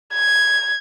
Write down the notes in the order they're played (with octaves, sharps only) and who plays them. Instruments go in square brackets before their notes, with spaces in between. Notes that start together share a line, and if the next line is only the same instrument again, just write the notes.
[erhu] G#6